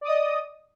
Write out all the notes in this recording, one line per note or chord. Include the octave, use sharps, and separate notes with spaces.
D5 D#5 D#6